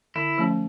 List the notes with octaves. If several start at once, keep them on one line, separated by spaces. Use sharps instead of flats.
D3 E4
F3 A3 C#4